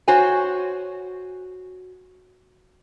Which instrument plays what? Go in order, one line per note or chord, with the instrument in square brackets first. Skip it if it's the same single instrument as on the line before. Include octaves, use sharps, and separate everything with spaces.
[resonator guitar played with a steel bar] F#4 C5 C#5 G#5